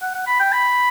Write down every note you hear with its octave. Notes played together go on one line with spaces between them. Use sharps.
F#5
F#5
B5
G5
B5